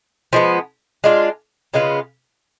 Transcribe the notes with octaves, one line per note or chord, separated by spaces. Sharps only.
F3 G#3 B3
G#3 D4 F4
C#3 G#3 B3 F4